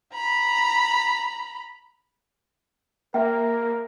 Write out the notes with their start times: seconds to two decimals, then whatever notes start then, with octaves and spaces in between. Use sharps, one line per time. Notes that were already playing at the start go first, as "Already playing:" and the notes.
0.14 A#5 B5
3.14 A#3 A#4 E5 G5